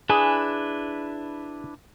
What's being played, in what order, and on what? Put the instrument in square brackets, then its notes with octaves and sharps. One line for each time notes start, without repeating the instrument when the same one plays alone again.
[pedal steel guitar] D4 E4 B4 [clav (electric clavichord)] G#4